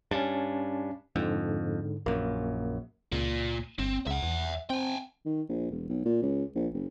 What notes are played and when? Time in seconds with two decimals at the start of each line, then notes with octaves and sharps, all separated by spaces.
0.11 G2 C#4 A5
1.16 F2 G#2 D3
2.06 A#1 F#2 A#3
3.12 C#2 A#2
3.79 G1 C4
4.07 C#2 E5 F#5
4.23 E2
4.70 C4 G5 G#5
5.25 D#3
5.49 A#1
5.71 E1
5.89 B1
6.05 A#2
6.22 C#2
6.55 A#1
6.74 F#1